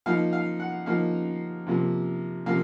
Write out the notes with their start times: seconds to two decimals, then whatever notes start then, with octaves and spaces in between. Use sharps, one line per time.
0.06 F3 A#3 D#4 F5
0.33 F5
0.60 F#5
0.86 F3 A#3 D#4 F5
1.67 C3 F3 A#3
2.46 C3 F3 A#3 F5